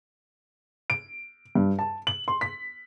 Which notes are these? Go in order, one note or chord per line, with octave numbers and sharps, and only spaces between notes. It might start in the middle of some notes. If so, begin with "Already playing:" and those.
D7
G2
A5
F#7
C6
B6